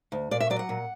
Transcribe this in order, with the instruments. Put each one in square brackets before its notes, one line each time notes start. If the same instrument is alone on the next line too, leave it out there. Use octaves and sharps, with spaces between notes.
[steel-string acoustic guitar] D2
A#2 D5
E5
F#3 D5
F#5
A#2